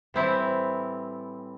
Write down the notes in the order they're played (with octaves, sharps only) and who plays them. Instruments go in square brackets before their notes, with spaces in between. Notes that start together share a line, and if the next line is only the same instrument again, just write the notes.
[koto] A2 E3 G3 C4 E4